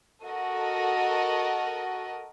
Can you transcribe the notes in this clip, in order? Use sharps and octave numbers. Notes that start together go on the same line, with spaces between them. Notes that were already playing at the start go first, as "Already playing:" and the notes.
F#4 A4 A#4 D#5